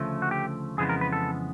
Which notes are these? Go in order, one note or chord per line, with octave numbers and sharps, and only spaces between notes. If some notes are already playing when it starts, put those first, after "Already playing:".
Already playing: D2 C#3 F3 A3
F#4
G4
F2 C#3 E3 G#3 B3 G#4
A#4
B4
A4